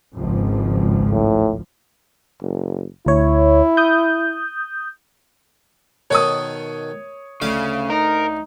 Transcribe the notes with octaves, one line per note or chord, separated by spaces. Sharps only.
G#1 C#2 F3
A2
F#1
D2 E4 C#5
D#6 G6
B2 D#3 A4 C#5 D#6
D2 C#3 F5 D6
D#4 A#4